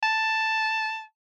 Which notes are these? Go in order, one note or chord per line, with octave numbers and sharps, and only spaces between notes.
A5